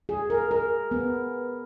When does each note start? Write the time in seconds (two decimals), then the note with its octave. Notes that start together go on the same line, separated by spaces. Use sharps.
0.09 G#4
0.30 A#4
0.51 A#4
0.91 B3